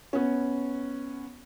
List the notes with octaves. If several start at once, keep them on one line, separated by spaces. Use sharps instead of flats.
B3 C#4